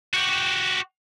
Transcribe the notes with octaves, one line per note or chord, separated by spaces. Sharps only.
F#4 G4